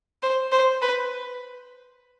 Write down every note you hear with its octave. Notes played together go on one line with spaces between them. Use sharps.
C5
C5
B4